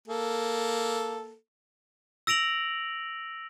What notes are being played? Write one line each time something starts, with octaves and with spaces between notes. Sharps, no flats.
A#3 A4
E6 A#6 D7 F7 F#7